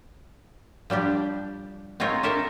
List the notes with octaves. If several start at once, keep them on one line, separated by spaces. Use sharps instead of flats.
F3 G3 D4 G4
G#3 C4 D#4 F4 A#4 C#5
G4 A4 A#4 E5 G5 A5